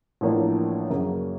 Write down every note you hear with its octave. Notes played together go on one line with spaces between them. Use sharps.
A1 A2 F3 A#3 D4
F#2 C#3 F#3 A#3